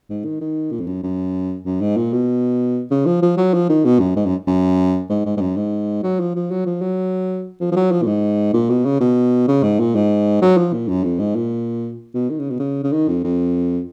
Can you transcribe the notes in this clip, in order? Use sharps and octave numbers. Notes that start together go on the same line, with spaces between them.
G#2
D#3
D#3
A#2
F2
F#2
F#2
F#2
G#2
A#2
B2
C#3
F3
F3
F#3
F3
D#3
B2
F#2
G#2
F#2
F#2
G#2
G#2
G#2
F#2
G#2
F#3
F3
F3
F#3
F3
F#3
F3
F3
F#3
F3
A#2
G#2
A#2
B2
C#3
B2
C#3
G#2
A#2
G#2
F#3
F3
A#2
F#2
F2
G#2
A#2
B2
D#3
C#3
B2
C#3
C#3
D#3
F2
F2